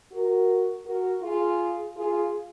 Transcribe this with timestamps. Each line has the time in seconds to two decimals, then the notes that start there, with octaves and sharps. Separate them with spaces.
0.12 F#4 A#4
0.85 F#4 A#4
1.22 F4 G#4
1.95 F4 G#4